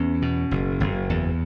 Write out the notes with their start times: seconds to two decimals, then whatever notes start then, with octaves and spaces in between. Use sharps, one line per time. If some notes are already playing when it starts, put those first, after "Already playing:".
Already playing: E2 B3 C#4
0.22 B2
0.51 F#1
0.80 F#1
1.10 E2